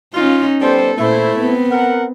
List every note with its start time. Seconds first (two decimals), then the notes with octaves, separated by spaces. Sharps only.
0.14 C#4 D#4 F4
0.61 G3 B3 A4 C5
0.97 A#2 A3 E4 C5
1.37 B3 C4
1.70 A#4 F#5